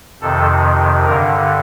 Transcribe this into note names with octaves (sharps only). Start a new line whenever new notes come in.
F2 C3 D#3 A4
G2 D3 A#4